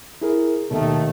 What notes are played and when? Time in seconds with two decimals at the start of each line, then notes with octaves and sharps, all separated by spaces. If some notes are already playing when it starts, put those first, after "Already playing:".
0.21 E4 G#4 A#4
0.71 D#2 B2 D#3 A3